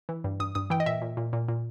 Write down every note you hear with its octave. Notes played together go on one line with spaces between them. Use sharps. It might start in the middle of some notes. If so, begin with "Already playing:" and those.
E3
G2
G2 D#6
G2 D#6
E3 G5
D#5
A#2 E5
A#2
A#2
A#2
A#2